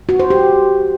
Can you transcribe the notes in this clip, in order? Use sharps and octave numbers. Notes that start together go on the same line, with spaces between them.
F#4
C5
G4